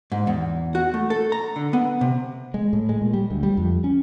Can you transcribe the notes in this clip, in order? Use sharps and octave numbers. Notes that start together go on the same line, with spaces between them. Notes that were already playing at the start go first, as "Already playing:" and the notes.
G#2
E2
F#4
A3
A4
A#5
D3
B3
C3
G#3
A2
G#3
A#2
G3
D2
G3
F2
C#4